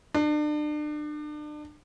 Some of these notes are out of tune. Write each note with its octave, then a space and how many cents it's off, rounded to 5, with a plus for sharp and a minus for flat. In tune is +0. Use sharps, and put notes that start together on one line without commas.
D4 +35